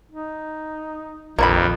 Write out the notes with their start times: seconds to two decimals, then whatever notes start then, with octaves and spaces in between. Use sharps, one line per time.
0.12 D#4
1.39 A#1 F2 D#3 A#3 C#5 B5